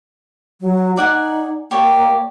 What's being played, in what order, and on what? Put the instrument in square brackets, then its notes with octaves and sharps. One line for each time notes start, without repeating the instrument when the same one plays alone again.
[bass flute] F#3
[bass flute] D#4 [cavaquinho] D5 F#5 G#5
[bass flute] A#3 [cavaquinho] G4 C#5 D5